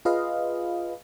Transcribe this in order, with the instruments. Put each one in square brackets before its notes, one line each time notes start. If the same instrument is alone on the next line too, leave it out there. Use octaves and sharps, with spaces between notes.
[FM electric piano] F4 G#4 B4 D#5 F5